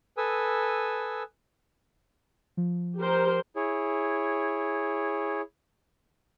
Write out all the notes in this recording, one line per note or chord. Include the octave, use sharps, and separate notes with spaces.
A4 B4 G#5 D#6 E6
F3
G4 A#4 C5
E4 G#4 C#5